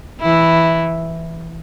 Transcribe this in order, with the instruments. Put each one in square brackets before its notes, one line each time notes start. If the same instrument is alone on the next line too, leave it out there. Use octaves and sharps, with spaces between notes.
[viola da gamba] E3 E4